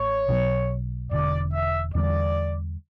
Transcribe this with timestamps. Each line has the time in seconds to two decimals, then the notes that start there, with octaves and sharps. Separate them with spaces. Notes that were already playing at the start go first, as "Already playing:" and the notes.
Already playing: A1 A2 C#5
0.28 B1 B2 F#3
1.11 E1 E2 D3 D5
1.53 E5
1.95 E2 D3 G3 D5